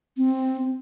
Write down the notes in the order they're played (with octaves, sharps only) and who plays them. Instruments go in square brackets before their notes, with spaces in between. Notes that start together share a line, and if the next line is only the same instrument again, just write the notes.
[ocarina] C4